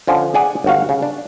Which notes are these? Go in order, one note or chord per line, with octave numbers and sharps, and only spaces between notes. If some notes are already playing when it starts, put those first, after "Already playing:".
D3 F3 C#4
G#4 D5 F#5 G#5
G1 D#2 F#4 F5
C#3
D4